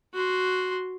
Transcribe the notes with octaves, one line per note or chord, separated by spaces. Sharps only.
F#4 C6